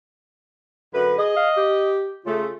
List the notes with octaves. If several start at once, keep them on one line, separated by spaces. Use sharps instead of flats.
F#2 D3 B4
G#4 D#5
F5
G4
C#3 A3 F4